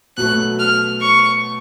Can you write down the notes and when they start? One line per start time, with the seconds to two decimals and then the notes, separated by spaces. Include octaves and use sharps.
0.17 B2 F#3 A3 F#6
0.60 F6
1.01 C#6